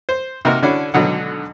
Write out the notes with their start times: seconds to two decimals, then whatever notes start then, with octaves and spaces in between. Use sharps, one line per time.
0.09 C5
0.45 C3 A#3 D#4 F#4 A#4
0.62 D3 C#4 D4 E4 F#4
0.94 G#1 B2 D3 F#3 F#5